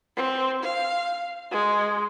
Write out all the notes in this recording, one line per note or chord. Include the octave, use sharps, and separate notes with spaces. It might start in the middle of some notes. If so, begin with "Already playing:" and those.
C4
F5
G#3